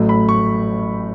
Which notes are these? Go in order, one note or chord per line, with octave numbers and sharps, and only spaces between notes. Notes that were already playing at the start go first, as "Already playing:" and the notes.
Already playing: A1 A2 F#3 A3
B5
C#6